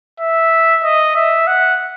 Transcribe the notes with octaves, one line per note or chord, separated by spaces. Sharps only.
E5
D#5
E5
F#5